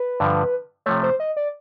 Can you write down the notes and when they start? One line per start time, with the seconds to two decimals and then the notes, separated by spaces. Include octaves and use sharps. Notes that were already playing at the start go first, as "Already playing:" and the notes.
Already playing: B4
0.20 G2 D3 F3
0.86 C3 F3 A3 C#5
1.03 C5
1.20 D#5
1.37 D5